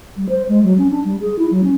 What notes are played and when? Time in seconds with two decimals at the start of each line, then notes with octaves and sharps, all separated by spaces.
0.17 G3
0.29 C5
0.49 G#3
0.63 F#3
0.78 C#4
0.91 D4
1.05 G3
1.21 G#4
1.39 E4
1.51 F#3
1.64 C#4